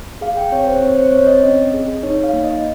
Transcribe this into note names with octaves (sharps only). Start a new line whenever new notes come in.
G#4 F5
G5
C4 C#5
C5
C4 C#5
C5
C4 C#5
C#5
D#5
C#4
G#4
D#4 C#5
F5
A#3
D#5